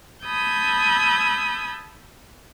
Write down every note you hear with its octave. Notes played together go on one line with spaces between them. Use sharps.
A5 B5 D#6 E6 G6 G#6